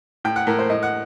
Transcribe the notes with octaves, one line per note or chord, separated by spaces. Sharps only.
A2 G5
F#5
A2 A#4
C5
A2 D#5
F#5